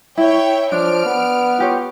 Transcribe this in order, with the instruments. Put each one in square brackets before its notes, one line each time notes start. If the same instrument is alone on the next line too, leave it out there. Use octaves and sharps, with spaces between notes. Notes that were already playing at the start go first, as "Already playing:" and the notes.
[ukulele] E4 [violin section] C#5 E5 G5
[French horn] F3 [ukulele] D4 [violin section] F6 D7
[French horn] B3
[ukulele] F4 G4 C#5